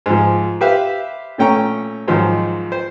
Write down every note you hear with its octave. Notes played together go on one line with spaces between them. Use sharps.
G#2 F3
G4 B4 C5 E5 F5
A#2 A3 C#4 G5 A#5 C#6
G#2 D#3 F3 F#3
C5